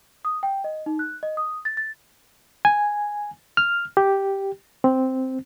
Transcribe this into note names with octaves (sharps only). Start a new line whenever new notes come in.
D#6
G5
D#5
D#4
F#6
D#5
D#6
A6
A6
G#5
F6
G4
C4